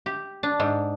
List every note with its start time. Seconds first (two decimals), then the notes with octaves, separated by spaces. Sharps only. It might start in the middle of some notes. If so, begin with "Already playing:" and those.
0.06 G4
0.43 D4
0.60 G#2